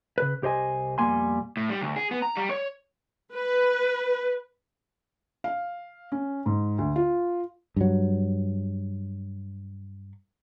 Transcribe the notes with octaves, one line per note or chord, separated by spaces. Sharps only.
C#3 B4
C2 G4 C5 D#5 G#5
F2 B2 G3 A#3 G#5 C6
A2
G3
D2
G#4
B3
A#5
G3
C#5
B4
F5
C#4
G#2
D2
F4
G2 F#3